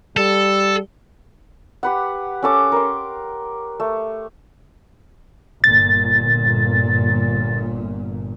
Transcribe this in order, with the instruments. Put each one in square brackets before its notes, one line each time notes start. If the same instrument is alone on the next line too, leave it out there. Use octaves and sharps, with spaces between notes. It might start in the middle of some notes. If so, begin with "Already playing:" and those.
[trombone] G3 [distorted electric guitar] A4
[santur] G4 B4 F#5
C#4 A4 D6
A#4 C6
A3
[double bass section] G1 A#2 [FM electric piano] A6